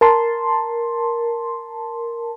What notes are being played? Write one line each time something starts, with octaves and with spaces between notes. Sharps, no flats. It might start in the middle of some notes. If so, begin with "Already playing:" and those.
A#4 A5 C6